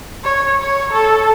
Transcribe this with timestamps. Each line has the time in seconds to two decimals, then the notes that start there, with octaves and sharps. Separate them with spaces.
0.24 C#5
0.61 C#5
0.92 A4